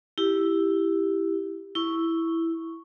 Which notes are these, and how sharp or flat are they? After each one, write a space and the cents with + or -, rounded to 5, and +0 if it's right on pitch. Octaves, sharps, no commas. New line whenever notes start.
E4 +0 G4 +0
E4 +0 C#6 +0